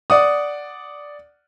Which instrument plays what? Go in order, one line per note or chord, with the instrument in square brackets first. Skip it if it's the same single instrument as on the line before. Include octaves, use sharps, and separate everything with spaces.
[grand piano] D5 F#5 D#6